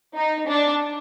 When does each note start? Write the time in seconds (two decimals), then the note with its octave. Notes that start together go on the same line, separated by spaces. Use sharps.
0.15 D#4
0.47 D4